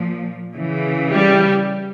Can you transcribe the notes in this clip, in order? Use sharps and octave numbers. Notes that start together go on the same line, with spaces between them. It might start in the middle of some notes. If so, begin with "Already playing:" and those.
Already playing: A#2 F3
C#3 E3
G3